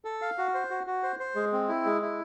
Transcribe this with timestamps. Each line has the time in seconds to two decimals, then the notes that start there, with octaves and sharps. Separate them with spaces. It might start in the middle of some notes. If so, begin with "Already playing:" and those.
0.05 A4
0.22 F5
0.38 F#4
0.54 C5
0.70 F#4
0.87 F#4
1.03 C5
1.20 C5
1.36 G#3
1.52 C4
1.68 E4
1.85 G#3
2.02 E4